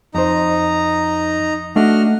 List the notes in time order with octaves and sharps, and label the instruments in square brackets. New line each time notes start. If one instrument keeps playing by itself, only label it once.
[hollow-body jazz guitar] F2 C5 [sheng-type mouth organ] D#4 A#5
[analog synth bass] A3 [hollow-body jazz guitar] D4 [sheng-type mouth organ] F#4 D#5 F6